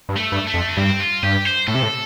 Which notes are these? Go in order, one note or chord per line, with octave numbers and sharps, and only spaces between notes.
G2
A3
G2
A3
F2
D4
G2 C4
F4
G2 G4
C5
A2 A4
C3
A2